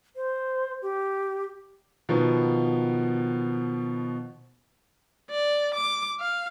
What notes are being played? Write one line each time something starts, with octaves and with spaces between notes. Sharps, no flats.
C5
G4
B2 D#3 F3 B3
D5
D6
F5